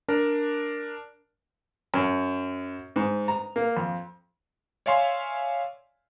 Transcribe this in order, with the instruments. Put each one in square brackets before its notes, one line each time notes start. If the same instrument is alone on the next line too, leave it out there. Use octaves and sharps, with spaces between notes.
[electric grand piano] D4 A#4
[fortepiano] F#2
G#2
A#5
A#3
F2
[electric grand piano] C#5 D5 E5 F5 G#5 C6